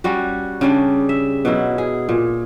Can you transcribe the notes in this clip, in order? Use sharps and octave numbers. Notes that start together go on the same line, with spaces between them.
G3 C#4 F#4
C#3 G3 D4
E5
B2 F#3 E4
G#4
A#2